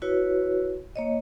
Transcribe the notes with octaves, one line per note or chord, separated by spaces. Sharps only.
E4 F#4 B4 C#5
A#3 C#5 D#5